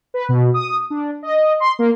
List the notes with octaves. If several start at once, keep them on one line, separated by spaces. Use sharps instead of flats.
B4
B2
D#6
D4
D#5
C6
A#3